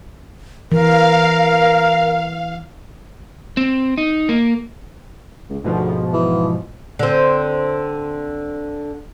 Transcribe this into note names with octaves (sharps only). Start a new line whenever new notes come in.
E3 A#4 F5
C4
D#4
A#3
C#2
D2 G#2 B2 F3
E3
D3 C4